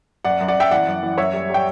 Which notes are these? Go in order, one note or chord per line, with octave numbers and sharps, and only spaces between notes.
F#2 D5 F#5
F#2
D5 F#5
F#2 E5 G5
E3 D5 F#5
F#2
E3
F#2 C#5 E5
G3
G3 G5